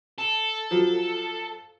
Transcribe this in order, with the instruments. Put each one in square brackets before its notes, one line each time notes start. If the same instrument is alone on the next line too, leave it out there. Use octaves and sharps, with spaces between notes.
[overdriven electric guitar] A4
[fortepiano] F3 F#3